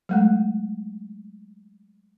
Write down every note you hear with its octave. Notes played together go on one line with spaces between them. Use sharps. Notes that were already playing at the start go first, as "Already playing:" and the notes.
F#3 G#3 A3